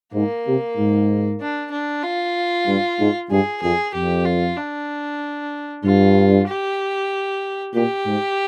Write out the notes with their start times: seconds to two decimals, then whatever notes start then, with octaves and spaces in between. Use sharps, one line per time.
0.13 G#2 A#3
0.46 C3
0.77 G#2
1.40 D4
1.71 D4
2.03 F4
2.67 G2
2.98 G#2
3.30 G2 G#4
3.62 F2 G#4
3.94 F2 G4
4.25 F4
4.57 D4
5.84 G2 F4
6.47 G4
7.74 A#2 G4
8.06 G#2